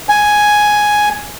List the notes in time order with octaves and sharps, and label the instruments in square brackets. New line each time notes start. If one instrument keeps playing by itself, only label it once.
[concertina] G#5